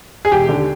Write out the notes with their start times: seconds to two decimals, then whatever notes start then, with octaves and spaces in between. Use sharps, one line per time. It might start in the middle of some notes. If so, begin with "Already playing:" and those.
0.25 G#4
0.31 E1 G4
0.49 D#2 D3